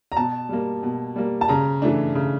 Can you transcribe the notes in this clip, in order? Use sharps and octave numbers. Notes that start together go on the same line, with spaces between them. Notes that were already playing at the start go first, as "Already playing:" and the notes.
A#5
B2 A5
G3 A#3
B2
G3 A#3
A5
C#3 A#5
E3 A3 D4
C#3